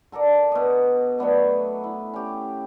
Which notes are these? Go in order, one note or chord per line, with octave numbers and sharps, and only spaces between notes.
D3 A4 A#4 D5
B2 D#5
F#3 A3 B3 D4
E4
C#4 G4